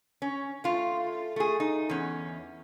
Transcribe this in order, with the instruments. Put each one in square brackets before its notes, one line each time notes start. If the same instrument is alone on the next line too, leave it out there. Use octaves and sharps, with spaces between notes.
[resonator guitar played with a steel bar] C#4
A3 F4
A3 G#4
D#4
E2 C#4